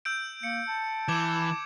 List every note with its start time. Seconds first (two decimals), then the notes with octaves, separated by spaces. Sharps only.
0.05 E6 G6 D7
0.43 A#3 C#7
0.68 A5
1.08 E3 D6 G#6 E7